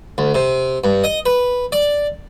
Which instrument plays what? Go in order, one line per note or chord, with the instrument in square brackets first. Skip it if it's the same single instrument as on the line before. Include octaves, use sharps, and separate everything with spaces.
[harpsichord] D2
C3
G2
D#5
B4
D5